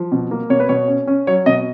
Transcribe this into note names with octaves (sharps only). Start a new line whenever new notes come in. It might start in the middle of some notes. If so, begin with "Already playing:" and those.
Already playing: F3
B2
A#3
B2 C#5
B4
B2 C#5
C#4
C#4
F#3 C#5
B2 D#5